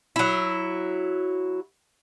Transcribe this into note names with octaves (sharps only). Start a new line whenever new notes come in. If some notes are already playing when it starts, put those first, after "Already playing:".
F#3 E4